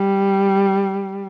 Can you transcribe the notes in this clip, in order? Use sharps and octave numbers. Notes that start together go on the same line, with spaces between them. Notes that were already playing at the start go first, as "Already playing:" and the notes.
Already playing: G3